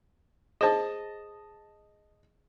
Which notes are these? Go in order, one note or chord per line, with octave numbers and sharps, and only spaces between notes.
G#4 C5 D#5 A5